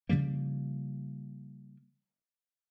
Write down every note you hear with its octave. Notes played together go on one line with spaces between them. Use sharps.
C#3 F3 G3 A#3